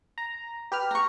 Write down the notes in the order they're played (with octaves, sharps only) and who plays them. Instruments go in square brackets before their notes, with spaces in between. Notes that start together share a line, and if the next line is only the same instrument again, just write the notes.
[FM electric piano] A#5
G4 B4 F6
[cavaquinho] A#5 C#6